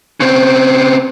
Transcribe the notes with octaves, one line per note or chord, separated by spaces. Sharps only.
C#3 C4